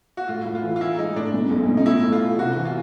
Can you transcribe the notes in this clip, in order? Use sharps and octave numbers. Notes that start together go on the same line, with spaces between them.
F#4
A2 F4
A2
F4
E3
F4
E3 E4
G#3 D#4
A2 D4
B2
B1
B2
D#4
A2 E4
A3
F4
A3
C3 F#4
E3
F4